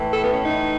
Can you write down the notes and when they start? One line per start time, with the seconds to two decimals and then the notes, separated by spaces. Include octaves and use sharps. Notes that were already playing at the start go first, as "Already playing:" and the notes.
Already playing: A2 E3
0.13 A4
0.23 B3
0.33 C#4
0.44 D#4